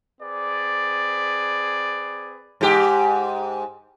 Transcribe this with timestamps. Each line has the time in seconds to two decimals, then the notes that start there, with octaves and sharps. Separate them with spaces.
0.21 C4 G#4 B4 D5
2.61 G#2 G4